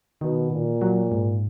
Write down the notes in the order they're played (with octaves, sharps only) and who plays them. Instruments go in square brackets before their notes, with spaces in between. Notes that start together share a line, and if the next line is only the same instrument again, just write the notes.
[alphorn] B2 [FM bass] D#3
[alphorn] A#2
[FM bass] F#3
G#2